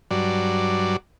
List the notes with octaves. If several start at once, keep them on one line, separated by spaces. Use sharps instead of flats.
G2 F#3 D5